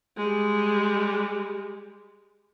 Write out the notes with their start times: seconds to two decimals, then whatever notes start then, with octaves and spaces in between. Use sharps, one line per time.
0.17 G3 G#3